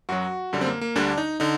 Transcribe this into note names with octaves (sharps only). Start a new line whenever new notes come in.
F#2 F#3 F#4
F#2 D3 G3
C4
A#3
A#3
D2 D3 G3 D4
D#4
D3 D#4